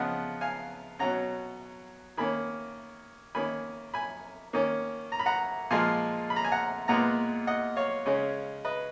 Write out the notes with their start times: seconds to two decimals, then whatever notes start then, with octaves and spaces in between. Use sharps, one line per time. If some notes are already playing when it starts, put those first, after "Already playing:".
Already playing: C#3 F3 B3 D#5 F#5
0.41 F5 G#5
0.99 B2 F#3 C#4 F#5 A#5
2.17 D#3 A#3 C#4 G#5 B5
3.35 D#3 A#3 C#4 G#5 B5
3.94 G#5 B5
4.53 D#3 A#3 C#4
5.12 A#5
5.19 B5
5.26 F#5 A#5
5.71 A#2 F3 G#3 F5 G#5
6.30 B5
6.36 A#5
6.44 G#5
6.52 F#5 A#5
6.88 A#2 G#3 B3 F#5 A#5
7.47 D#5 F#5
7.76 C#5 F5
8.06 C#3 G#3 C#4
8.65 B4 D#5